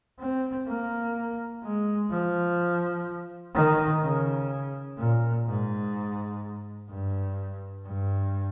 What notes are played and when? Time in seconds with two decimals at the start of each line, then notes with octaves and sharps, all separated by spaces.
0.19 C4
0.67 A#3
1.63 G#3
2.11 F3
3.54 D#3
4.02 C#3
4.98 A#2
5.46 G#2
6.89 G2
7.85 G2